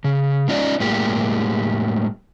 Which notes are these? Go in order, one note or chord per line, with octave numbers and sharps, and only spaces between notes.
C#3
G#3 C#4 D#4 F4 D5
A2 G3 G#3 A#3 G4